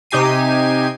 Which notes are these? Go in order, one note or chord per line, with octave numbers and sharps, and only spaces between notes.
C3 D#4 G4 G#5 C7 D#7